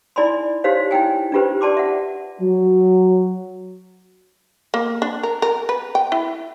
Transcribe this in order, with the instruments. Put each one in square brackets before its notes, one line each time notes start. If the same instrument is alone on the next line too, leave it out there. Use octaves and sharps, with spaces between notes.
[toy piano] D#4 E4 D5 G#5 B5 C6
D#4 G4 C5 C#5 F5 C6
D#4 E4 G5 G#5
D4 D#4 F4 G4 B4 C5
G4 D5 A5 C6 D6
E5 F#5
[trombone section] F#3
[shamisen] A#3
D4
A#4
A#4
B4
G5
E4